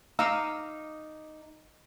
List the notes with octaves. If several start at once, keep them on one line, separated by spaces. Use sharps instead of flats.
D#4 D#5 F5 A#5 D6 E6